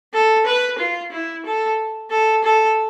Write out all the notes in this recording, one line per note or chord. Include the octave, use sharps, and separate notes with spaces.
A4
B4
F4
E4
A4
A4
A4